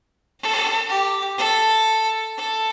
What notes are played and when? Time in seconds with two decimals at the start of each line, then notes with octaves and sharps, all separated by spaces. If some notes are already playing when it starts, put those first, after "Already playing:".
0.39 A4
0.88 G4
1.37 A4
2.36 A4